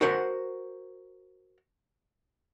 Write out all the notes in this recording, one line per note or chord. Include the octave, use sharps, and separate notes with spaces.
F#4 A#4 C5 F#5